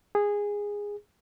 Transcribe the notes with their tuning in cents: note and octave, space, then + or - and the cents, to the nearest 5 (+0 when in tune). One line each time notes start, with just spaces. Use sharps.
G#4 -15